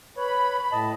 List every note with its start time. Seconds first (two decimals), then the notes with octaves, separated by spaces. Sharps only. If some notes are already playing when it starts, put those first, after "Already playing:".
0.17 B4 C#5 B5
0.72 A2 D#5 A5